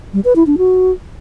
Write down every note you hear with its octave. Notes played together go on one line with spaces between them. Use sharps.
G3
B4
E4
D4
F#4